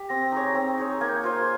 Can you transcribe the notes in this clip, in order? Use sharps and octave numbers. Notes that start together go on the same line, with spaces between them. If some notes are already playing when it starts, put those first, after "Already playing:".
Already playing: G4
C4 A#6
D#4 G#4 C#5
C4
D#4 G#4 C#5
A#3 G#6
G6
G#6
F4 C5 F5